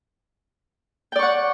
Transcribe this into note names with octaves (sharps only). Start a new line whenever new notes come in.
D5 F#5 G5 C#6